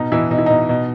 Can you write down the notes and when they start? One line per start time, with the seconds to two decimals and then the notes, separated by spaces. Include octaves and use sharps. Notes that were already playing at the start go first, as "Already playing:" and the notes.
Already playing: B2 D#4
0.12 B2 E3 E4
0.31 B2 D#4
0.38 E4
0.46 B2 D#4
0.69 B2